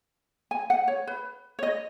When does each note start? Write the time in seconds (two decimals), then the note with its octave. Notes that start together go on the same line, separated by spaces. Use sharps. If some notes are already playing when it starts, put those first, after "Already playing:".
0.51 G#5
0.70 F#5
0.88 C#5
1.07 B4
1.59 C#5
1.63 D#5